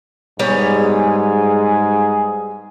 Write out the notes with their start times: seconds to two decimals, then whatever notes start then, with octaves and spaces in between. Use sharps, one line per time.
0.39 G#2 G3 B3 G#4 C#5